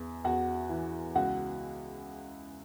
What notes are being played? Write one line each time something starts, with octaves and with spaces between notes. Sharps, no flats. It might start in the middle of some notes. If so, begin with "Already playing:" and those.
Already playing: E2
E2 F#4 F#5
E3
C#2 F#4 F#5